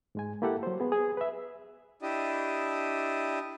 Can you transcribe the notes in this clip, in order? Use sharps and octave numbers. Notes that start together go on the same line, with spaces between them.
G#2 G#3 G#5
A#3 E4 G4 A4 F#5
F#3 C5
B3 G#4
G#4
B4 E5
D4 E4 G4 D#5